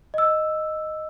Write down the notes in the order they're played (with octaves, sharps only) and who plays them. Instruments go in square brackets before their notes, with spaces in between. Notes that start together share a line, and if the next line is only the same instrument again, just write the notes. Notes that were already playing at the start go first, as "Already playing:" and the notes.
[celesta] D#5 E6